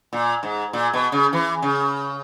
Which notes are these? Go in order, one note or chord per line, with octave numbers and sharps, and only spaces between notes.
A#2
G#2
A#2
B2
C#3
E3
C#3